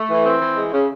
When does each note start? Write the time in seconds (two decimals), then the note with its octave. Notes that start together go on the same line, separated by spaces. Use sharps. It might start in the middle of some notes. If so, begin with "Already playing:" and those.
Already playing: A3
0.10 E3
0.25 C4
0.40 E3
0.56 G#3
0.72 C#3